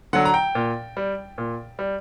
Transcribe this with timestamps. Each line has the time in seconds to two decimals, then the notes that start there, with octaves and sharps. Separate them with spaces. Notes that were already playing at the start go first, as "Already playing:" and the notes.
0.13 D3 F#3 F#5
0.25 A#5
0.34 G5
0.55 A#2
0.97 G3
1.38 A#2
1.79 G3